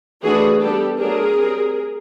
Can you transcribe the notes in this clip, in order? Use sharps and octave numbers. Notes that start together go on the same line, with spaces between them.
E3 A3 D4 F#4 G#4
G3 B3 D4 G4 A4
F#3 A3 D4 G#4 A#4
G3 C4